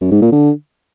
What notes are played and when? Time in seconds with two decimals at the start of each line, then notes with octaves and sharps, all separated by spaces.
0.01 F#2
0.11 G#2
0.21 A#2
0.32 D3